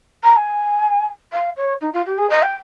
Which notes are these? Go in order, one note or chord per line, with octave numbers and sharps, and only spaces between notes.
A#5
G#5
F5
C#5
D#4
F4
G4
G#4
D#5
G5